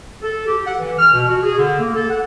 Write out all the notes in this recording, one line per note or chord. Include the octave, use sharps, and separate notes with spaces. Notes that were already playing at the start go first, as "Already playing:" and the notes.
A4
G4
F#5
E3
F6
B2
F#4
G#4
D3
A#3
A4
F#5